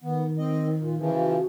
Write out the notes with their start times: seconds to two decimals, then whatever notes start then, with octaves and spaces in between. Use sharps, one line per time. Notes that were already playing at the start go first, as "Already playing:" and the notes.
0.01 D#3 B3
0.38 C4 D#5
0.79 A#2
0.98 C#3 E3 F3
1.13 F#4